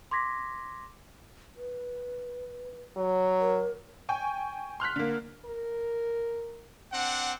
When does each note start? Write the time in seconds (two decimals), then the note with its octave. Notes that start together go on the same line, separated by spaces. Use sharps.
0.11 C6 D6 G#6 A#6 B6
1.56 B4
2.96 F#3
3.40 A#4
4.09 G5 G#5 C#6
4.80 C6 F6 F#6 B6
4.96 D3 A#3
5.45 A#4
6.92 C4 D4 F#5